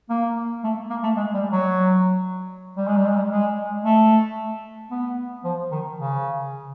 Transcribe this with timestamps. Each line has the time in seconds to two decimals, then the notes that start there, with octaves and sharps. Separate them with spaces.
0.10 A#3
0.64 A3
0.90 A#3
1.03 A3
1.16 G#3
1.34 G3
1.52 F#3
2.77 G3
2.87 G#3
2.96 G3
3.06 G#3
3.16 G3
3.30 G#3
3.84 A3
4.91 B3
5.44 F3
5.71 D#3
5.98 C#3